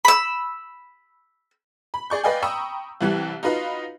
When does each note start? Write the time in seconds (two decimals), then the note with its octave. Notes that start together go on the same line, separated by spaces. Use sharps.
0.05 B5 E6
1.94 B5
2.10 G#4 D5 C#6 G6
2.23 B4 D5 D#5 F5 G5 G#5
2.42 G5 A#5 B5 C#6 D#6 E6
3.01 C2 E3 G3 F#6
3.43 D#4 F4 F#4 B4 D#5 F5